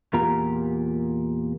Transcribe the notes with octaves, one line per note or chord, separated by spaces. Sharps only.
E2 A#2 F4 G4 A#4 A#5